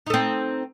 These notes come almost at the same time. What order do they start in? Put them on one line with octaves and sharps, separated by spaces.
D#4 A4 C4